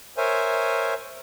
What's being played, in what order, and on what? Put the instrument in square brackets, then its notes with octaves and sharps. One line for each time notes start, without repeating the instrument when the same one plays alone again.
[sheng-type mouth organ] A#4 C5 C#5 E5 G#5